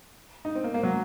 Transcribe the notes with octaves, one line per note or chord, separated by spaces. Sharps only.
D#4
C4
A#3
A#3
F#3